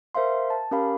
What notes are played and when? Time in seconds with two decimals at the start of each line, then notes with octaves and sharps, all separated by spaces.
0.15 A#4 C5 E5 F5 C6
0.50 A5
0.71 C#4 G4 A#4 F5 B5